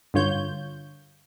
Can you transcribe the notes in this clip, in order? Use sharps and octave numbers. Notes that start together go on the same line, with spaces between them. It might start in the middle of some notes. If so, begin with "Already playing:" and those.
G2 D3 F4 C#5 G6